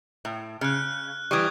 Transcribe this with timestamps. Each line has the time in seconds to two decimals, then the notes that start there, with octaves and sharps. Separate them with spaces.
0.25 A2
0.61 C#3 F6 F#6
1.31 E3 G3 C#6 D#6 G#6